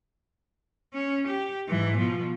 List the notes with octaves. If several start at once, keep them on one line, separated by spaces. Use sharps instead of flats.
C#4
G4
G#2 E3
B2 F3